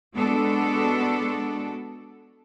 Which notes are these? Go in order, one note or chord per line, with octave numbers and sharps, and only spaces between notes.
G#3 B3 D4 F#4 A4